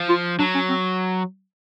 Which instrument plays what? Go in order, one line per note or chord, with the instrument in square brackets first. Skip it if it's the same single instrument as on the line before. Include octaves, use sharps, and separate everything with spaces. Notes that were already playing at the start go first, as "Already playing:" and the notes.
Already playing: [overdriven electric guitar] F3
[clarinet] F4
[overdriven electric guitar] F#3 [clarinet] D4
[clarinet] C#4
C4